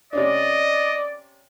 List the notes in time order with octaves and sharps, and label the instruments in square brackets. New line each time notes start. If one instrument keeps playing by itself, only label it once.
[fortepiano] C3 C#4 D4 [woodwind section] D5 [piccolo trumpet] D#5